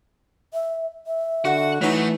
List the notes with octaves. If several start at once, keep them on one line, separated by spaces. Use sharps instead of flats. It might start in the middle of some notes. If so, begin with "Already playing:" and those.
E5
E5
D3 F#4 F#5
E3 F#3 A3 D#4